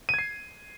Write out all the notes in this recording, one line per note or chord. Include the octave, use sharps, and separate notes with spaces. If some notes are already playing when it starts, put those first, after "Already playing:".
G#6 C7 D#7